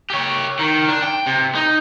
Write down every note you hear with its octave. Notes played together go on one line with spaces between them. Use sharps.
G4 C#5
D#3
D4
G5
C3
D#4